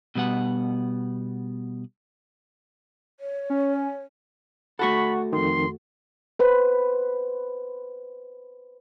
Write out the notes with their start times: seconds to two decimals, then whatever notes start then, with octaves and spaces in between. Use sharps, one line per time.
0.15 B2 G3 B3 F#5
3.20 C#5
3.50 C#4
4.79 A3 F#4 A4 F#5 B5 C#6
5.33 F2 D#3 C6
6.39 B4 C5